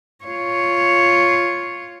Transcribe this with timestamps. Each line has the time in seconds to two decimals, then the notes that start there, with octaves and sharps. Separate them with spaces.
0.24 F4 C#5